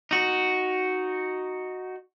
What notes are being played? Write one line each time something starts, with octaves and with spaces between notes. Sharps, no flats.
D#4 F#4